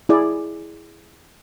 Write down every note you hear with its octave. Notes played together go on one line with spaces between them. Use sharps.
E4 G#4 D5